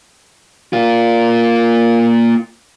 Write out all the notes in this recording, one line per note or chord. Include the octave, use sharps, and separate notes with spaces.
A#3 F4